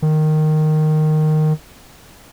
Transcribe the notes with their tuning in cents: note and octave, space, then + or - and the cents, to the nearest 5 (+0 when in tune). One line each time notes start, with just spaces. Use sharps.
D#3 -10